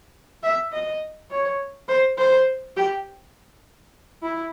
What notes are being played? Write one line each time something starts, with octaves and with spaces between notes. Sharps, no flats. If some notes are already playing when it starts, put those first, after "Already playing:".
E5
D#5
C#5
C5
C5
G4
E4